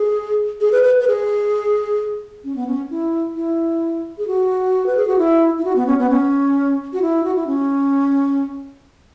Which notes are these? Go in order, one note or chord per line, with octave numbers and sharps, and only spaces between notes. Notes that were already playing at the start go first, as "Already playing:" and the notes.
Already playing: G#4
G#4
B4
B4
B4
G#4
C#4
B3
C#4
E4
E4
G#4
F#4
B4
G#4
F#4
E4
E4
F#4
B3
C#4
B3
C#4
F#4
E4
F#4
E4
C#4